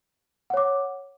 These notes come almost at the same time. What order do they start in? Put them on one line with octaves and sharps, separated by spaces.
F#5 C#5 D6